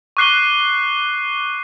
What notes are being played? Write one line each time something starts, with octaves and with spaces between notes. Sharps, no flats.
C#6 D6 F#6 C7 D#7 G7